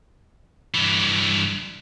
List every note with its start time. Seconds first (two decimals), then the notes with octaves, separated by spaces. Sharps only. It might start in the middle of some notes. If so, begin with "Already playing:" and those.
0.75 G2 E3